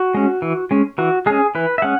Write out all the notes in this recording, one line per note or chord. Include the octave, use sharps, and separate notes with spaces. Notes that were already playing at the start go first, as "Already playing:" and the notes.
Already playing: F#4
G#3 C#4
E3
G#3 C#4
E3 F#4
G#3 C#4 G#4
E3 B4
E5
G#3 C#4 F#5